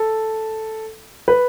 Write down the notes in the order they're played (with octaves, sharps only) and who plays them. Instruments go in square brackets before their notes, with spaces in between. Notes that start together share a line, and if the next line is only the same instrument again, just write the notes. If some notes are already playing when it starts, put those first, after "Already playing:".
Already playing: [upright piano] A4
B4